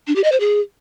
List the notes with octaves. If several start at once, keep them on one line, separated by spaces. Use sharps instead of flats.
D4
G4
D#5
C5
G#4